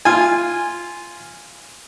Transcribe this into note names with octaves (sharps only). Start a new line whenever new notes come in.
F4 G#5